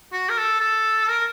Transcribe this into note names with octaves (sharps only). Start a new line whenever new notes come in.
F#4
A#4
A4
A4
A#4